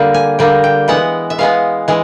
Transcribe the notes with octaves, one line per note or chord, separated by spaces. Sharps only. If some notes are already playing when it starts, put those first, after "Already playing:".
Already playing: D3 G3 A#3
G#5
D3 G3 A#3 G5
G5
E3 G#3 B3 F#5
E5
E3 G#3 B3 F5
E3 G#3